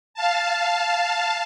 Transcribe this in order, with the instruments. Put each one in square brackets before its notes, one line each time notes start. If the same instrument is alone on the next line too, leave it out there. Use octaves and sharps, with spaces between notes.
[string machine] F5 A5